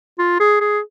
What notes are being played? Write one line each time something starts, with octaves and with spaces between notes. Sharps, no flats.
F4
G#4
G#4